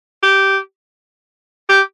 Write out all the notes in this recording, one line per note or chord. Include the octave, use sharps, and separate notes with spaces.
G4
G4